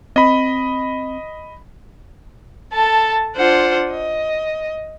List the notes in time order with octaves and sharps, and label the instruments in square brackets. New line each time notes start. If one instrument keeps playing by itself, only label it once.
[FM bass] C4 [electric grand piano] D#5 B5
[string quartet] A4 A5
D4 F4 C5 F#5
D#5